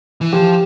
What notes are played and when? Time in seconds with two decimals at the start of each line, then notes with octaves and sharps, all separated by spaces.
0.21 E3
0.32 F3 G4